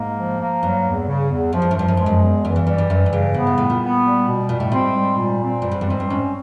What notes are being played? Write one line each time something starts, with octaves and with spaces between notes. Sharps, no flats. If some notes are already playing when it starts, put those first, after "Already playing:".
Already playing: G#2 A#3
F3
A#3
G2 F#3
E2
C#3
E2
F#2 F3
G2
F#2
G2 F3
F#2
G2 G#3
F#2
E2
F#2 E3
G2
G2 G3
G2
F#2 E3
G#2
G2 C#3
G#2 B3
A2
A2 G3
A#2
B3
G3
B2
A#2 G3
A2
G#2 C4
G3
A#2
C4
G2 G3
G#2
G2
G#2 C4
G2
G#2 C#4